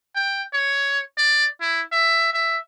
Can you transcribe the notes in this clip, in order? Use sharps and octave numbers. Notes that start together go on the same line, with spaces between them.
G5
C#5
D5
E4
E5
E5